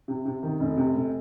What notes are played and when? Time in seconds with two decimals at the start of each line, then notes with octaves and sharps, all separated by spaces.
0.08 C3
0.25 C3
0.43 D#3
0.60 F1
0.77 C3
0.94 F1